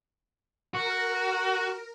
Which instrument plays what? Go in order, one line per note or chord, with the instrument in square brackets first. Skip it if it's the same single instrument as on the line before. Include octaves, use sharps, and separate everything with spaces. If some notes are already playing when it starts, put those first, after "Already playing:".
[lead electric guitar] F#4 [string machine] A#4